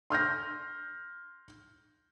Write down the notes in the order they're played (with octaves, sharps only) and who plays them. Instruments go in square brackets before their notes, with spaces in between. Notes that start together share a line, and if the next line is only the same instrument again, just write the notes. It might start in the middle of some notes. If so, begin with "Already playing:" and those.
[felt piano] C6 F6 G6 A#6